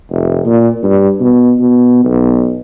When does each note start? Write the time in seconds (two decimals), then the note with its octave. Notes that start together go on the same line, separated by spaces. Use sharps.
0.10 F1
0.45 A#2
0.83 G2
1.20 B2
1.59 B2
2.04 B1